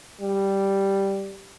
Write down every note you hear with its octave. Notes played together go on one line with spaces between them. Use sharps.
G3